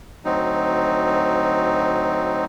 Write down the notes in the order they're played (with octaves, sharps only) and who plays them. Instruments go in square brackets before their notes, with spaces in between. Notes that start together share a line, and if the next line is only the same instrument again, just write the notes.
[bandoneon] D2 F#3 C4 D#4